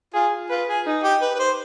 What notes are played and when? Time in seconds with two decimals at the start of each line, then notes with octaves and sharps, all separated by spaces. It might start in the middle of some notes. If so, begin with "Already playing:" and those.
0.14 F4 G#4
0.49 F4 B4
0.68 G#4
0.86 D#4
1.04 G4
1.21 B4
1.35 B4
1.39 C5